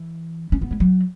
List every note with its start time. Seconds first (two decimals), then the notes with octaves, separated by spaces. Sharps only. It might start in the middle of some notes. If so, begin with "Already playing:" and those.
Already playing: E3
0.52 C#4
0.61 B3
0.71 G#3
0.80 F#3